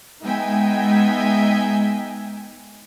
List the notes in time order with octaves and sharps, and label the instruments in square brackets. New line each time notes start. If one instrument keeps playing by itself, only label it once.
[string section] G#3 B3 D#4 E5 G5 G#5